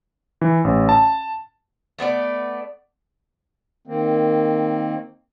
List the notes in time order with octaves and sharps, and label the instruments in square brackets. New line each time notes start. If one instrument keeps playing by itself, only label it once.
[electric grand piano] E3
A1
A5
[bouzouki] A3 B3 C#5 D5
[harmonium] D#3 A#3 C4